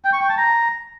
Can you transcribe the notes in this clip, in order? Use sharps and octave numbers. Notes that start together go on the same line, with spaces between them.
G5
C#6
G5
A5
A#5